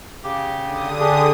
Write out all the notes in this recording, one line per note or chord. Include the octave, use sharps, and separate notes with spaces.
C#3 G4
D3 D#6
D4 G4 G#4